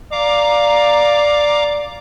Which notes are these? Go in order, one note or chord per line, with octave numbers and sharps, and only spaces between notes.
D5 F5 A#5 D6